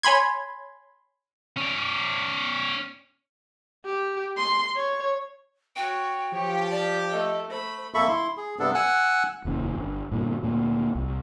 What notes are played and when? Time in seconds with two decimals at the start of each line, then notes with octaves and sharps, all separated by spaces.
0.03 C#5 G#5 B5 C6 G#6
1.57 C#4 D5
3.85 G4
4.37 C6
4.76 C#5
5.76 F#4 C#5 G5
6.33 F3 G4 C#5
6.71 D5 A5
7.12 A3 A4 D#5
7.50 A3 C5 B5
7.94 F2 A#3 A4 E5 B5 C#6
8.08 E4 C6
8.37 G#4
8.59 G2 C3 B3 D4 A4
8.75 F#5 G#5 E6 F#6
9.45 F1 D#2 C#4
9.76 G1
10.11 G2 A#2 D3
10.42 D2 A#2 A#3
10.95 C2